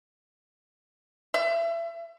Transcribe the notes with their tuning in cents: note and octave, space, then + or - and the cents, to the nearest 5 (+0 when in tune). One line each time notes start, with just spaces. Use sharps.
E5 +30